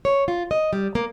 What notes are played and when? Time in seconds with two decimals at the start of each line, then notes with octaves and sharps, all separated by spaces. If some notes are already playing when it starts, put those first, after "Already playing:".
0.05 C#5
0.28 F4
0.51 D#5
0.73 G3
0.95 A#3